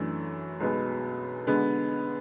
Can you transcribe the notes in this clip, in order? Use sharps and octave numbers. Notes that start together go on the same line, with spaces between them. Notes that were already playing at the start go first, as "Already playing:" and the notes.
Already playing: F#2 E3 A3 D4
B1 B2 G#3 B3
D3 G#3 B3